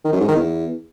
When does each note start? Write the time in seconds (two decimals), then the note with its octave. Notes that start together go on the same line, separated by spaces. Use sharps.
0.05 D#3
0.13 F#2
0.21 G#2
0.28 D#3
0.36 E2